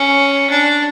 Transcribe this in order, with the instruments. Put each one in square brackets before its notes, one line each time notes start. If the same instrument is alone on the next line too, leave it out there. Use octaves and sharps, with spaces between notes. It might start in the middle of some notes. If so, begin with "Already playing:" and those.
Already playing: [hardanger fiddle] C#4
D4